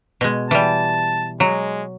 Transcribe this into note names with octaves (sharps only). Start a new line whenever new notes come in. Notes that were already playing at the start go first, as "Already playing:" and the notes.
B2 G#3
E3 G3 A5
F#3 G#3